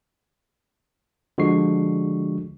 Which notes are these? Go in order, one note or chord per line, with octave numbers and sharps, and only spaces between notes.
D3 F3 G#3 F#4 C#6 C7